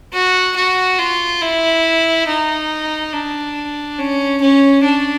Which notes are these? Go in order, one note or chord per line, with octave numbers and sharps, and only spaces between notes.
F#4
F#4
F4
E4
D#4
D4
C#4
C#4
D4